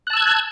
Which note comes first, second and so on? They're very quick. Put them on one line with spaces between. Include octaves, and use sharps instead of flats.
F#6 A5 E6 G#6